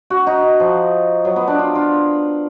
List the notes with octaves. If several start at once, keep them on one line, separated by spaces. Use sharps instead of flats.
F#4
D#4
F3
F#3
B3
D4
F4
F4